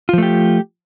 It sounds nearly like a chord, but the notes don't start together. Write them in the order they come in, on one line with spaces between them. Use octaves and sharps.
F4 F3 A3 G4